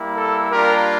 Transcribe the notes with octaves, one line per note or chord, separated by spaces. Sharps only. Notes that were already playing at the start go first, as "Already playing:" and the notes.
Already playing: G3 A#3 E4
A4
G3 A#3 D4 F4 G4 A#4